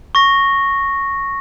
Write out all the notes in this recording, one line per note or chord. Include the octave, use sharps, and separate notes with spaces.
C#6 A#6